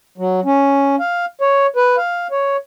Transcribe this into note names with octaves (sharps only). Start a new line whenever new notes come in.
F#3
C#4
F5
C#5
B4
F5
C#5